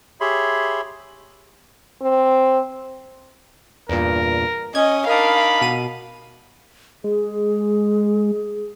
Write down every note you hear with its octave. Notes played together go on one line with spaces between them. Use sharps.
G4 G#4 C#5 E5 B5 C6
C4
E2 G2 A#2 A#4
C#4 D#5 G#6
D4 D#4 A#4 F5 B5
B2 D#7
G#3 G#4